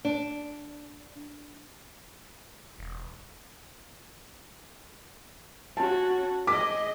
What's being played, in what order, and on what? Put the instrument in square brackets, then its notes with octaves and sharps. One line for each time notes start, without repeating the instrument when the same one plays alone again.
[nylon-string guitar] D4
[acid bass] E1
[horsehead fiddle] C#4 F#4 [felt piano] A5
[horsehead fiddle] G#4 D#5 [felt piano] D6 B6